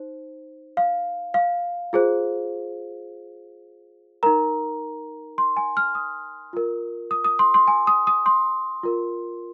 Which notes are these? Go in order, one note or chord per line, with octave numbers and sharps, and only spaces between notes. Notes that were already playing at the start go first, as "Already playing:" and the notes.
Already playing: D#4 C5
F5
F5
F4 G#4 C5
D#4 A#4 A#5
C6
G#5
F6
D#6
F4 A#4
D#6
D#6
C6
C6
G#5
D#6
D#6
C6
F4 A#4